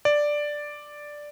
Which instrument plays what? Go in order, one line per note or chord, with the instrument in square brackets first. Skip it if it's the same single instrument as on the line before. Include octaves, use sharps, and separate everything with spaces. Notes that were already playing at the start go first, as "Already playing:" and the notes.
[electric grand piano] D5